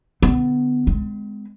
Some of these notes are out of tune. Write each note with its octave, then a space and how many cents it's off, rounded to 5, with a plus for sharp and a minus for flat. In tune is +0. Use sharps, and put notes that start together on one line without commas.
D3 +0 B3 +15
G#3 +0 C4 -45